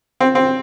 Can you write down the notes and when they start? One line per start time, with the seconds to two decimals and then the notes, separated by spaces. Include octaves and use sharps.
0.20 C4
0.35 C4